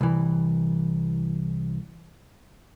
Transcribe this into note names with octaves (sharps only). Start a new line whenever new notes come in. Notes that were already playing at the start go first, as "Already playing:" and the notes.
C2 E3